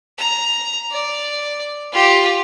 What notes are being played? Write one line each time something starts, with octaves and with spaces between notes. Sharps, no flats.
A#5
D5
F4 G4